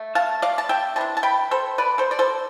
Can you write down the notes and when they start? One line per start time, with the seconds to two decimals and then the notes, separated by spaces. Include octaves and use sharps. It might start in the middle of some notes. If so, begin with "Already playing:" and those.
Already playing: A3
0.15 F5 A5
0.42 D5 F5
0.58 A5
0.69 E5 G5
0.96 C3 E3 D4 A5
1.17 A5
1.23 G5 B5
1.51 A4 C5
1.78 B4 D5
1.98 A4 C5
2.11 D5
2.19 A4 C5